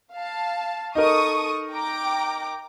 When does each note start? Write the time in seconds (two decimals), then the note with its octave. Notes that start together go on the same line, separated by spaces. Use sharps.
0.13 F5 A5
0.95 D#4 A4 A#4 C#6 D#6
1.72 G5 A#5 D6